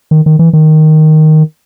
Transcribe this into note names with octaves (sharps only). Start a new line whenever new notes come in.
D#3
D#3
E3
D#3